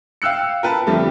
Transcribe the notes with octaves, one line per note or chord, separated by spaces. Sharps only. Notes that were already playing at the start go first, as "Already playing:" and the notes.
F5 G5 E6 F#6 C#7
A#4 B4 A5
F2 D3 F3 G3 A3